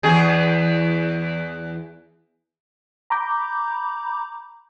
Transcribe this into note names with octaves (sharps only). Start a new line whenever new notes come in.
E2 G#4
A#5 B5 D6 G6